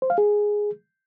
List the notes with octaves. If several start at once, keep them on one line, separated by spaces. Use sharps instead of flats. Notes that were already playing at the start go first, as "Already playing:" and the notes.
C5
F5
G#4